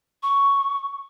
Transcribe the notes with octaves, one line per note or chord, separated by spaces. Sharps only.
C#6